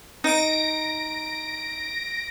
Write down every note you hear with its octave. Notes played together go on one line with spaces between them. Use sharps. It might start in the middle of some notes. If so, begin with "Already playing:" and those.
D#4 A#6 D7